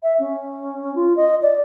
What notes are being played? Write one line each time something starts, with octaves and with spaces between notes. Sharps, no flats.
E5
C#4
F4
D#5
D5